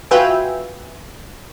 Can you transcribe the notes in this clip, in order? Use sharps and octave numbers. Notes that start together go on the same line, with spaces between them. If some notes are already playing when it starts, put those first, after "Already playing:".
F4 F#4 B4 E5 G5 G#5